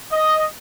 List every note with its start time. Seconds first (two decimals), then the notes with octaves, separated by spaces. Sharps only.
0.12 D#5